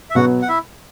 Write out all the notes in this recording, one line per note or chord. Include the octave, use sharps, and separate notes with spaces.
E5
B2 F#3 B3 F#4 F#5
F#5
E4 E5